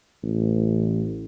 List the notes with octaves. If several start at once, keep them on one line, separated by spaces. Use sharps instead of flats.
A1